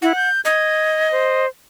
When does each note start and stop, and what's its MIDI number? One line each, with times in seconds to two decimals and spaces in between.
0.02 0.13 64
0.02 0.29 78
0.16 0.41 91
0.45 1.45 75
0.45 1.11 92
1.11 1.48 72